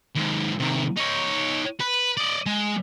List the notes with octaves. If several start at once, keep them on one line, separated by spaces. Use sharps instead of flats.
D#2 G#2
C3 D#3
D#4 C#5
B4
D5 D#5
G#3